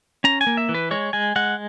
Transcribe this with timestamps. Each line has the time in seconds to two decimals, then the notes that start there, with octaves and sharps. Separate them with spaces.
0.24 C#4 A#5
0.41 G#5
0.47 A#3
0.57 E5
0.69 E3
0.74 B4
0.91 G#3 C#5
1.13 G#3 G#5
1.36 G#3 F#5